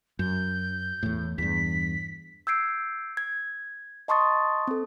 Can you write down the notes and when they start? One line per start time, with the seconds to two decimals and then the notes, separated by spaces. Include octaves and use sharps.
0.19 F#2 G6
1.03 E2 A2
1.38 E2 G2 B6
2.47 E6 G6 G#6 C7 D7
3.17 G#6
4.08 D#5 A5 C6 C#6 D#6 A6
4.67 C4 A4